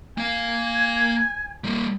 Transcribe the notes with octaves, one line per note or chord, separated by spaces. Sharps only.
A#3 F5 G#5
G3 A#3